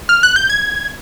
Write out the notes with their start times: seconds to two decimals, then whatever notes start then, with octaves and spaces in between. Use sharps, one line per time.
0.09 F6
0.23 F#6
0.36 G6
0.50 G#6